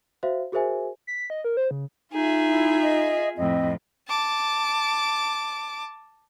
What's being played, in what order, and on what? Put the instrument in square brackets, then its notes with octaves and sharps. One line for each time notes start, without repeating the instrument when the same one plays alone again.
[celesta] F#4 C5 E5 F5
F#4 G#4 A#4 C5 E5 G#5
[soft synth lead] B6
D#5
A#4
C5
C#3
[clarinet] D#4 [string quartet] F4 G#4 E5
[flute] E4
D#5
[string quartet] F2 A2 [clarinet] C4 [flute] D#5
[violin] A5 D6